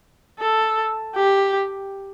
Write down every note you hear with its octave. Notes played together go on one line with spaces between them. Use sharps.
A4
G4